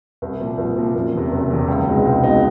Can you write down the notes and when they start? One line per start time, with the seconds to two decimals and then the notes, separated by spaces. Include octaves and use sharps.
0.22 C2
0.40 A#2 F3
0.58 C2
0.77 A#2 F3
0.95 F#1
1.14 E2 C3
1.32 F#1
1.50 E2 C3
1.68 C#2
1.87 B2 G#3 C4 D#4
2.06 C#2
2.23 B2 G#3 C4 D#4